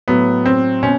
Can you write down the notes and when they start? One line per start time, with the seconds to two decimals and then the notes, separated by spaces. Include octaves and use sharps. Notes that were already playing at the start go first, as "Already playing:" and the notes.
0.08 A2 F#3 B3
0.46 C4
0.83 B2 C#4